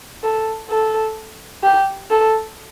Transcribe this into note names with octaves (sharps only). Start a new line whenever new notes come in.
A4
A4
G4
A4